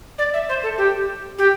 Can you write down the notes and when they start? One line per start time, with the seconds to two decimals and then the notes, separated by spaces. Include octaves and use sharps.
0.18 D5
0.33 E5
0.49 C5
0.63 A4
0.77 G4
1.38 G4